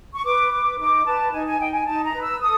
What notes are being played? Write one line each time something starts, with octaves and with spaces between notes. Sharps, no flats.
C#6
B4 D6
B4 D6
D#4 D6
B4 A5
D#4 G#5
G#5
D#4 G5
G#5
D#4 A5
A#5
B4
E6
A4 D#6